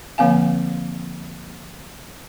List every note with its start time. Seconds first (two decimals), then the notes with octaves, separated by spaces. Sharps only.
0.18 D3 F3 A#3 C4 F5 G#5